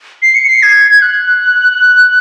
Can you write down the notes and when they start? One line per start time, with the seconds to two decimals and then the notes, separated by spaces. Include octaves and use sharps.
0.22 C7
0.35 C#7
0.47 C7
0.63 G#6
1.02 F#6